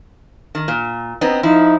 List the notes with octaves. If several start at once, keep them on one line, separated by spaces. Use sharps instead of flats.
D#3
A#2
B3 C4 D#4
F3 D#4 E4